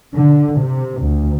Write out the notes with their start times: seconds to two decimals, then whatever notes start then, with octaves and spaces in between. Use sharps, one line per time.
0.15 D3
0.60 C3
1.01 D2